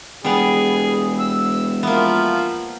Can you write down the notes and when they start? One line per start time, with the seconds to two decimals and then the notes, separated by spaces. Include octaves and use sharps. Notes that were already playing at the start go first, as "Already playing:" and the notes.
0.24 E1 G3 B3 G#4
1.19 E6
1.83 F3 A#3 B3 E5